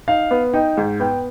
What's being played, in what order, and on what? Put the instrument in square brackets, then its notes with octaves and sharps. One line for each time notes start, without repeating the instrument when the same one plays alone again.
[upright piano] D#4 [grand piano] F5
[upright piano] B3
[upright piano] D#4 [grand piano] G5
[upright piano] G#2
[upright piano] B3 [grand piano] G5